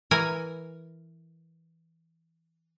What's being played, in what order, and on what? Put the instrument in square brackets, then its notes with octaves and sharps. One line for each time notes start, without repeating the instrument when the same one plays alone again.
[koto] E3 A#4 G#5